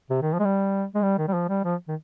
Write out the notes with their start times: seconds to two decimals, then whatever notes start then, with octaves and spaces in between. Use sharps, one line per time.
0.10 C3
0.22 D#3
0.33 F3
0.39 G#3
0.44 G3
0.95 G#3
1.02 G3
1.18 D#3
1.28 G3
1.34 F3
1.49 G3
1.64 F3
1.88 D#3